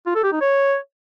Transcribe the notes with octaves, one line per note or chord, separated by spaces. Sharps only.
F4
A4
G4
D#4
C#5